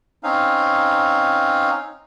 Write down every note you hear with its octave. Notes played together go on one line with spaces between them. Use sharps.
C4 C#4 D#4 F5